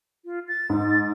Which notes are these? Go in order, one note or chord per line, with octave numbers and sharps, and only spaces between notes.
F4
A6
G#2